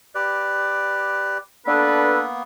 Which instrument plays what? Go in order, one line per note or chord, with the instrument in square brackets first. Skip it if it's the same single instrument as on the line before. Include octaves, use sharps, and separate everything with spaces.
[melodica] G4 B4 D5
[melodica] A#3 B3 [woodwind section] D4 A4 B4